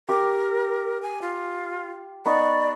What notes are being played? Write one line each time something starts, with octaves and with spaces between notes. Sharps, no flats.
G4 A#4 D6
G#5
F4
B3 D#4 D5 C#6